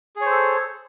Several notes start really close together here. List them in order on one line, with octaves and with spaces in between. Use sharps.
G#4 C#5 C5 A4